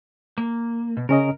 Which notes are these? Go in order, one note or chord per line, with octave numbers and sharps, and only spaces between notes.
A#3
B2
C#3 C#4 A#4 D#5